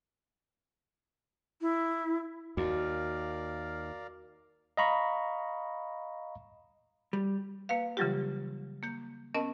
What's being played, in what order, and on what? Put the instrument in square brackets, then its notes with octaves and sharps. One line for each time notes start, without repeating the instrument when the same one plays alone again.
[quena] E4
[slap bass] D#2 [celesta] F#4 [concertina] A#4 D5 F5
[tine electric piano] D#5 F5 A#5 B5 C#6
[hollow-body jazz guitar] G3
[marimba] A#3 B4 F5
C#3 E3 F#3 G3 F4 G4
A#3 G6
B3 C#4 A#4 D#5 A5